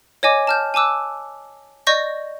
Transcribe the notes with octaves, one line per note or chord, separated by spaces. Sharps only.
C#5 D#5 G#5 D6
A5 F6 G6
G#5 A5 D6 E6 F#6
D5 D#5 C#6 G6 A#6